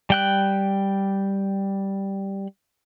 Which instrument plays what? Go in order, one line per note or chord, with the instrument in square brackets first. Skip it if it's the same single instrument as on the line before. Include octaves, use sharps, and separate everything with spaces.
[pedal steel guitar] G3 G5 F#6